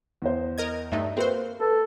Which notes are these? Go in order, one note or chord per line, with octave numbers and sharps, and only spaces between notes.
E2 C5
A#4 D#5 G#6
G2 A3 D#4 E5
A#3 C4 F#4 B4 C5
A4 B4